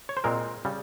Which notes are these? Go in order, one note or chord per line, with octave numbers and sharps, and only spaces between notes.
C#5
C5
A#2 G#3 C4 A#4
C#3 G3